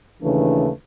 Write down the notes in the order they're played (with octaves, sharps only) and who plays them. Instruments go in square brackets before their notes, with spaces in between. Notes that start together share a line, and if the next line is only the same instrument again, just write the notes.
[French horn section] D#2 C#3 E3 A3 D4 B4